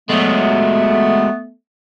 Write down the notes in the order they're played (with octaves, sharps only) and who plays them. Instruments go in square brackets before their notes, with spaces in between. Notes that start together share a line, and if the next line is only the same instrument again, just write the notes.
[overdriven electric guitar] F#3 G#3 [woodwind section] A3 B3